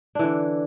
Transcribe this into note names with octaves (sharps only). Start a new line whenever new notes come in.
D3 E3 D4